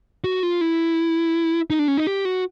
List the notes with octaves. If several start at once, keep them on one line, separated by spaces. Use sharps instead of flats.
F#4
F4
E4
D#4
D4
C#4
D#4
G4
F#4